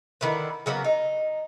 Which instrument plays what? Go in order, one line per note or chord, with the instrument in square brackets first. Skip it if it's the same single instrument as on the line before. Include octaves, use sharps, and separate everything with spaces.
[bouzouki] D3 D#3 E4 B4
C#3 F#3 A#3 B3
D#4